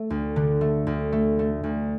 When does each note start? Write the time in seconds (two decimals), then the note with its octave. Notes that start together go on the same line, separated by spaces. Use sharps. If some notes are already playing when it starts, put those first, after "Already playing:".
Already playing: A3
0.10 D2
0.36 D3
0.61 A3
0.87 D2
1.12 A3
1.39 A3
1.64 D2